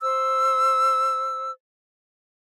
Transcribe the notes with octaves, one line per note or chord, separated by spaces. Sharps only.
C5 E6